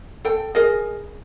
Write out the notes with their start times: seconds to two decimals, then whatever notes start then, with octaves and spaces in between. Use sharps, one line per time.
0.25 A4 G5
0.55 G#4 A#4 D#5